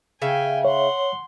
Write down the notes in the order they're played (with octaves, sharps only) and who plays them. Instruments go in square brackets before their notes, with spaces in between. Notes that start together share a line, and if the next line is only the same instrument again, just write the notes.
[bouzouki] C#3 E5 F5 [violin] G5 G#5
[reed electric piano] C#5 [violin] F#5 C6